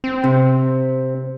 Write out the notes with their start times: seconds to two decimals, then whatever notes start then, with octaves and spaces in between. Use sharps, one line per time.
0.04 C4
0.24 C3